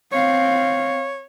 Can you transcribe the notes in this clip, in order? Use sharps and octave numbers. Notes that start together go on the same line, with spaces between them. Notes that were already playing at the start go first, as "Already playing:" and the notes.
C4 C#5 F5